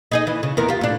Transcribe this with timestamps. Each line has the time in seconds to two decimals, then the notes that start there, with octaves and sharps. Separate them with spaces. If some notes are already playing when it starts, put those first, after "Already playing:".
0.11 D#4 G#4 D#5
0.27 E3
0.43 C#3
0.57 E2 B3 A#4
0.69 F4 G4
0.81 A2 D4